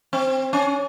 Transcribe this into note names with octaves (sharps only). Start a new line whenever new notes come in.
C4
C#4